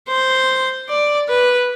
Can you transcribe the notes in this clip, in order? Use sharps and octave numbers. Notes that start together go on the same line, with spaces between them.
C5
D5
B4